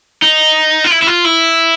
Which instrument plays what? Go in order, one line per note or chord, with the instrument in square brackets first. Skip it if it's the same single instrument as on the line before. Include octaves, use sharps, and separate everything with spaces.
[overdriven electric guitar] D#4
F4
E4
E4
F4
E4